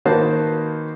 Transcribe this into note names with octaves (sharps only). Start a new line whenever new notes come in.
D#3 A#3 F#4 B4 C5 A5